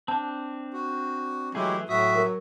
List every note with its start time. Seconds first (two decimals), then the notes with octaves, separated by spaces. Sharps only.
0.08 C4 D4 A5
0.73 F#4
1.55 E3 F#3 G#3 A3 E4 G4 G#4
1.89 A2 F#3 F#4 E5 D#6
2.16 F#3 A#4